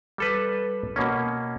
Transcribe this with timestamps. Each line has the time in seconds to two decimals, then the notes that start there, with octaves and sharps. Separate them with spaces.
0.18 G3 A4 B4
0.96 B2 A#3 C#4